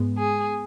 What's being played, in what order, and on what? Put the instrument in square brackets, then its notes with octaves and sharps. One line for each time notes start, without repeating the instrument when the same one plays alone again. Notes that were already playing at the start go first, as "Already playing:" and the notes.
Already playing: [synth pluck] G#2 G#3 B3
[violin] G#4